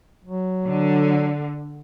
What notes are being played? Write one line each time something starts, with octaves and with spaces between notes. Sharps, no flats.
F#3
D3